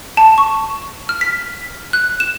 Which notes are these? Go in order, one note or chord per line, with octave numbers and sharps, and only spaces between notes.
A5
C#6
F6
B6
F#6
E7